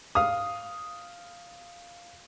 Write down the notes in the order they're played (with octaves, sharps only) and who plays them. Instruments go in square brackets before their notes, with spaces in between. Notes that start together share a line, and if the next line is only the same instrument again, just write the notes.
[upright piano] F5 D#6